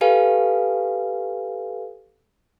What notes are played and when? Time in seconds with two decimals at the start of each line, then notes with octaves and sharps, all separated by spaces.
0.01 G4 A4 B4 F5 G#5